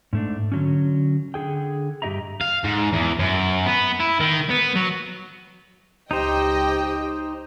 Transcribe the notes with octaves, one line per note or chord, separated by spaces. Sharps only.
G#2 A3 D4
D3 F#3 C#4
D3 G#4 G5
G2 B2 G4 D#5 E5 A#5
F5
G#2
E2
F#2
B3
E4
D#3
B3
F#3
C#2 D#4 G4 C5 D#5 G5